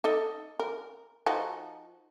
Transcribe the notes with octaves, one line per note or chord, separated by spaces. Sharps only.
D#4 A4 D#5
A#4
F3 D#4 F#4